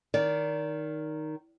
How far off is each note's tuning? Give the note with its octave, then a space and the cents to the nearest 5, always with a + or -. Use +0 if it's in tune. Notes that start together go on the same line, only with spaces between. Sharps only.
D#3 +0 D5 -25